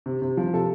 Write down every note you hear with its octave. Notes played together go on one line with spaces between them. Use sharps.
C3
C3
F3
C3 A4